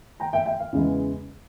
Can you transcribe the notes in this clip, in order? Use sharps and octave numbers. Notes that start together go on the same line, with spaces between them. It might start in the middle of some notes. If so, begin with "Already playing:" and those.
G5 A#5
E5 G5
E5 G5
F5
E2 C#3 E3 G#3